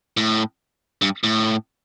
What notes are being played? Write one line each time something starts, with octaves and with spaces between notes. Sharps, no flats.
A2
G2
A2